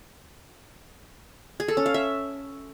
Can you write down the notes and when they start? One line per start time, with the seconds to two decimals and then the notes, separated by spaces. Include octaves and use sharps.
1.60 G#4
1.68 A4
1.77 C#4
1.86 F5
1.94 E5